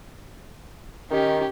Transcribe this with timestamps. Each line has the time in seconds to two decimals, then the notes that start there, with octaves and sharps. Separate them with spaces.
1.11 D#3 C#4 G4